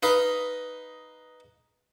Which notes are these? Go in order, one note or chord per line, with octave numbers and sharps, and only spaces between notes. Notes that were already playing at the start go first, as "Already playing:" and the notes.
D#4 B4 D#5 F5